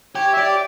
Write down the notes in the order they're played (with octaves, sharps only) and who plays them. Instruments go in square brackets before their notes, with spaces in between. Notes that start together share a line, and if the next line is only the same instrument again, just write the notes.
[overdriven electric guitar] G4 [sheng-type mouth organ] C#5
[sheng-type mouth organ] E5
[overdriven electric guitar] G4 [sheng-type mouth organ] D5